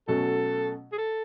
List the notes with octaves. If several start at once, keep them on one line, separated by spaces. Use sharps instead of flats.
B2 F#3 A3 C#4 A4
G#4
A4